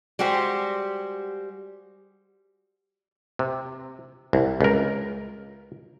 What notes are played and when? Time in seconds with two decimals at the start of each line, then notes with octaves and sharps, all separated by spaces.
0.19 G3 G#3 F#4 G4 C5
3.39 C3
4.33 C2
4.61 C#2 A#4